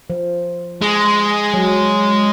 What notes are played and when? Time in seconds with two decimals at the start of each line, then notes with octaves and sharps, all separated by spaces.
0.10 F3
0.82 G#3
1.54 F#3